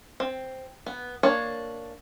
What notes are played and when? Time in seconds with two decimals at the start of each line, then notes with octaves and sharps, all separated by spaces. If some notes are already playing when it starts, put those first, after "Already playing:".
0.20 C4
0.86 B3
1.23 A#3 D4 C#5